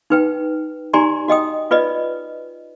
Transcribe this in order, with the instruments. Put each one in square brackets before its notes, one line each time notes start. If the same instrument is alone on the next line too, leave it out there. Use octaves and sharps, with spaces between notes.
[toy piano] D#4 B4 G5
D#4 G4 D5 G#5 A#5 C6
F#4 D#5 G5 D#6
F4 B4 D5 D#5